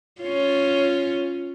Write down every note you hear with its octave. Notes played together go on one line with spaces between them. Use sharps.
C#4 F4